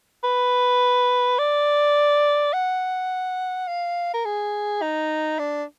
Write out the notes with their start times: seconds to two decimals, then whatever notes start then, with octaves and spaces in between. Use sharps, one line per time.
0.24 B4
1.38 D5
2.53 F#5
3.67 F5
4.14 A#4
4.25 G#4
4.82 D#4
5.39 D4